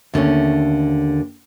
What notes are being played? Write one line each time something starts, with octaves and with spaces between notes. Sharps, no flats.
D#2 D3 A3 C#4